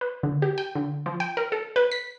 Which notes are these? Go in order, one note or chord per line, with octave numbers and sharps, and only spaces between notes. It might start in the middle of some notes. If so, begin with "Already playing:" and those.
B4
D3
G4
G5
D3
F3
G5
A#4
A4
B4
B6